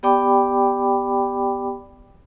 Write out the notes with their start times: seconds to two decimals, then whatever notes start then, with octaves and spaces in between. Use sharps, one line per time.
0.03 B3 G4 D5 G5 B5 D6